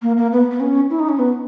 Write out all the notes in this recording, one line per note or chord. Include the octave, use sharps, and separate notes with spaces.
A#3
A#3
B3
B3
C#4
E4
D#4
C#4
B3